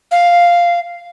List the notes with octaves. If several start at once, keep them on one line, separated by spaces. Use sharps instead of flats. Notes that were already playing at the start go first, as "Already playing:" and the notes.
F5